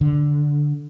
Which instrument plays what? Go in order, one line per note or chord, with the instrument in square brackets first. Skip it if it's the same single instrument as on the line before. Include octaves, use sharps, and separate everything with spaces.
[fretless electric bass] D3